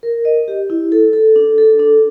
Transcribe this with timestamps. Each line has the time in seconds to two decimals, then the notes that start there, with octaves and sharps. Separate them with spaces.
0.03 A#4
0.25 D#5
0.48 G4
0.70 E4
0.92 A4
1.13 A4
1.36 D4
1.58 A4
1.79 D4